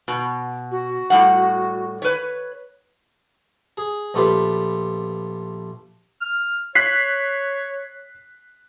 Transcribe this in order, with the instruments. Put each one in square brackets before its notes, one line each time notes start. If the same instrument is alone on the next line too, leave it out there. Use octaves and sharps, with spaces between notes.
[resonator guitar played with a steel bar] B2
[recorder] F#4
[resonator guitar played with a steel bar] A2 G3 F#5
B4 C#5
[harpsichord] G#4
A#1 A3 F4 G4 B4 F5
[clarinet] F6
[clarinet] C#5 [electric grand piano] F#6 B6 C7